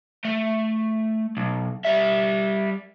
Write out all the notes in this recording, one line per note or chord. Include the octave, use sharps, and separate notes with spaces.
A3
B1
G3 E5